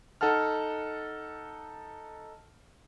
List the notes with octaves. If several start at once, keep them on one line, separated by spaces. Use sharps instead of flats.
D#4 A4 F#5 A5 F6